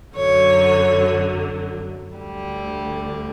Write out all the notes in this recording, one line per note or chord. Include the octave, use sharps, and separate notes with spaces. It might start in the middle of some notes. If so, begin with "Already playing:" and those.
F#2 D3 F#3 C#5
D2 D3 G3